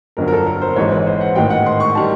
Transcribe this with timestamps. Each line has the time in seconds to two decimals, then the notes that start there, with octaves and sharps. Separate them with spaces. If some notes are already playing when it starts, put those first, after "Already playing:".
0.17 G1 F2 D3 F#3 A#4
0.28 A#4
0.33 A4
0.47 A#4
0.62 C5
0.76 G#1 G#2 E3 G#3 C#5
0.92 B4
1.07 C5
1.21 F#5
1.36 A1 G#2 D#3 G#3 G5
1.50 F#5
1.66 C6
1.80 C#6
1.95 D#3 G3 A5